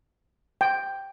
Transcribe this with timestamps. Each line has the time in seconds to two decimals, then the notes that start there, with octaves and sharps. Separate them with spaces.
0.61 G5